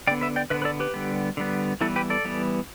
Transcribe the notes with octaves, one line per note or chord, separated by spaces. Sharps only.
D3 B3 D5 G5
B4 E5
D5 G5
D3 B3 B4 E5
B4
A4 D5
G4 B4
D3 G3 B3
D3 G3 B3
E3 G3 B3 E4 A4
G4 B4
A4 D5
E3 G3 B3